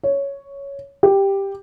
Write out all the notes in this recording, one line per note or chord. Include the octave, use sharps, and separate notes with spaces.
C#5
G4